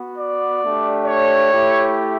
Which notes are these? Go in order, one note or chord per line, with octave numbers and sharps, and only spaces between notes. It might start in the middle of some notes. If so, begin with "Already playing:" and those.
Already playing: B3 F#4
D5
A3 D4 G4
C#5
A3 E4 G4